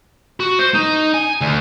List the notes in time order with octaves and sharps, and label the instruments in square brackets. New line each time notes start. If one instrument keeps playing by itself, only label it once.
[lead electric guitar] F#4
C5
D#4
G#5
D2